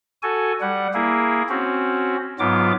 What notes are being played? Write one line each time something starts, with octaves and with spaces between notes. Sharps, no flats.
F#4 A4 G#5
G3 F#5
A#3 E4 G#4
C4 C#4 F#4
G#2 F#3 B3 F4 D6